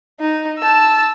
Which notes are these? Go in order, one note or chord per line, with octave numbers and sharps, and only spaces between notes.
D#4
A5 E6